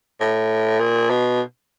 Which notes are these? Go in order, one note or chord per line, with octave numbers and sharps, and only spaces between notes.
A2
A#2
B2